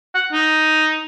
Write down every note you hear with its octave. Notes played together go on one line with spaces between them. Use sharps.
F#5
D#4